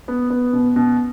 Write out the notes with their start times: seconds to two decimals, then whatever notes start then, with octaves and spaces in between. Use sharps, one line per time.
0.08 B3
0.30 B3
0.53 B2
0.76 B2